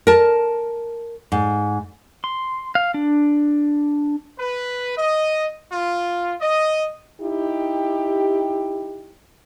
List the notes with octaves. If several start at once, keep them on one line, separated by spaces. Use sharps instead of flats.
A#4 A5
G#2
C6
F5
D4
B4
D#5
F4
D#5
D#4 E4 G4